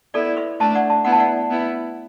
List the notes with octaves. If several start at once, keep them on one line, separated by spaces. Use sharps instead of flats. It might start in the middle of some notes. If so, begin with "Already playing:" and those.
B3 E4 A4 D5
B4 E5
A3 D4 E5 A5
D5 F#5
E5 A5
B3 E4 F#5
A5
D5 F#5
B3 E4